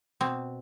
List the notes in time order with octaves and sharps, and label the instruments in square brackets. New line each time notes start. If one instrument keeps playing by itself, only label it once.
[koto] B2 C4